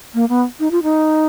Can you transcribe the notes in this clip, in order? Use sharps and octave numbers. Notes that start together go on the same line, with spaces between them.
A#3
B3
D#4
F4
D#4